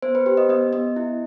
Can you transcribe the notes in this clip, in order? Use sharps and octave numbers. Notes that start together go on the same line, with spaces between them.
B3 C5
B4
G4 C5
D#5
B3 D#5
B3 D#5
E4